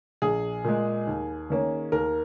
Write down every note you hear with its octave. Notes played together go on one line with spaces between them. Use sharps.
A#1 G#4
A#2 G#3
D#2
D#3 A#3 C#4
D#2 A#4